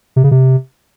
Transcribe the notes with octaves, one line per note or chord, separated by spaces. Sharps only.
C3
C#3
C3